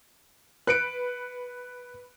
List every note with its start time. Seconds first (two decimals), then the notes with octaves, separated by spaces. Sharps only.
0.67 B4 F#6 C#7 D7